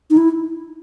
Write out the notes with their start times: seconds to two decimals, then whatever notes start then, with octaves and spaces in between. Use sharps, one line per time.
0.10 D#4
0.17 E4